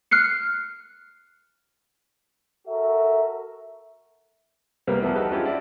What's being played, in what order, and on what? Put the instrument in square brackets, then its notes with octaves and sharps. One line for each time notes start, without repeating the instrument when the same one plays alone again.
[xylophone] F6 F#6 C7 C#7
[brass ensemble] F#4 A4 A#4 E5
[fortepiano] C2 G3 A#3 B3 A#4 B4
E2 F3 B3 E4
D#4 F#4 G4 A4 B4
G#3 C#4 D4 E4 F4 G4
E4 F#4 D5